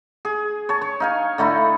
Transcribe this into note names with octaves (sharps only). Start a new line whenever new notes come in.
G#4
C#5 A5
C#5
D#4 F5 G#5
D3 A3 D#4 E4